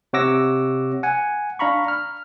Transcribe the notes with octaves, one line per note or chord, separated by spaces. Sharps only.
C3 C#5 F#5 D6 E6 A#6
F#5 G#5
D4 F5 A#5 B5 C#6
F6